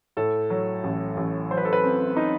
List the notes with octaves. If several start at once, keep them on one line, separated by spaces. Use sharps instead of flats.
A2 A4
F#3
A1
A1
F#3 C5
B4
A4
B4
C4
D#4